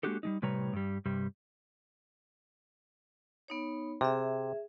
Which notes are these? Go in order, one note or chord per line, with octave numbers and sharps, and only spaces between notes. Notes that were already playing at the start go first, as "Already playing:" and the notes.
G#3 A#3 D4 F#4 G4 A4
G3 G#3 D#4
A2 C3 G3 B4 C#5 A#5
G2 G3
G2 C3 G3
B3 D#4 C#5
C3 G#4 E5